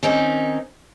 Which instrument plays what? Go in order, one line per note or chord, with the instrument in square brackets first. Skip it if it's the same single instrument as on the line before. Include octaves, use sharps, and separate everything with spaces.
[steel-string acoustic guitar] D#3 C4 C#4 D#4